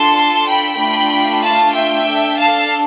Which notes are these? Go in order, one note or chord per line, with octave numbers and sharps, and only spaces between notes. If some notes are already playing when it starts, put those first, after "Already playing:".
Already playing: D4 F4 A4 A5 C6
G5 B5
A3 D4 F4
F5 A5
E5 G5
D4 A4
F5 A5